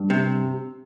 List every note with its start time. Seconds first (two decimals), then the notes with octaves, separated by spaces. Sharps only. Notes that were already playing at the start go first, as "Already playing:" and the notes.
Already playing: G2
0.10 C3